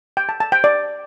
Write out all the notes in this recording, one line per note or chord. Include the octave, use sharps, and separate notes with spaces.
G5
A5
A5
G5
D5